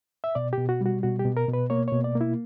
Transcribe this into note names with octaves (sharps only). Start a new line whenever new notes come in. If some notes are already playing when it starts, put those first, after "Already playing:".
E5
B2 D5
G4
B2
F#4
G3 F#4
B2 F#4
G4
B2
A#4
B2
B4
A#3 C#5
B2 C#5
D5
A#3
E4